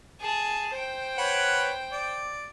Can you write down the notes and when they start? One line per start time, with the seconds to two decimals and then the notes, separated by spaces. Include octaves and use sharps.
0.21 G#4 A5
0.74 C5 G5
1.18 B4 C#5 F#5
1.92 D5